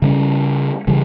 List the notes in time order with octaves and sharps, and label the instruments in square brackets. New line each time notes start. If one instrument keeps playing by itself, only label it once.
[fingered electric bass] C#3 G3 C#4
C#3 E3 G3